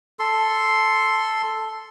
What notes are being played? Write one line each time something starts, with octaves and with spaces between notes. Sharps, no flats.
A4 C6